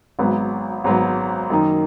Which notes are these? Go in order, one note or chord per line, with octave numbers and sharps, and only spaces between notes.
G#1 G#2 F#3 B3
G#1 G#2 F#3 B3
F#2 D#3 A#3 D#4